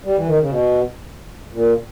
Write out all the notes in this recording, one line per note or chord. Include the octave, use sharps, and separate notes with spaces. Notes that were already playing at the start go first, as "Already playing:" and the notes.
G3
E3
D#3
C#3
B2
A#2